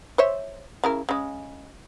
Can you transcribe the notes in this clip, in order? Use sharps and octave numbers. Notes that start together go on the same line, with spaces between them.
C5 C#5 E5
C#3 E4 A#4
C#3 G#3